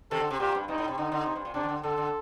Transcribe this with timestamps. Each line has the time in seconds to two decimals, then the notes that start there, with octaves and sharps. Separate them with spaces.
0.11 C3 D#3 A4
0.20 D3
0.30 C3
0.40 A#2 G4
0.55 G2
0.68 G2 D#4
0.78 A2
0.88 C3
0.98 D3 D#4
1.12 D3
1.26 C3
1.35 G2
1.45 A#2
1.54 C3 D4
1.63 D#3
1.68 D3
1.83 D3 A4
1.98 D3